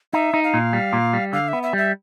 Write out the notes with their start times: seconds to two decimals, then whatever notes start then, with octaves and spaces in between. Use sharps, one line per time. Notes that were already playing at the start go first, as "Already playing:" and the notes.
0.13 D#4 E5
0.34 D#4
0.44 F5
0.54 A#2
0.73 G3
0.93 A#2
1.13 G3
1.33 D3 F5
1.48 B3 E5
1.63 E5
1.73 G3 E5